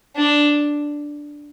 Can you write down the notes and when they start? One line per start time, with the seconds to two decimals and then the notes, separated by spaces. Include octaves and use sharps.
0.16 D4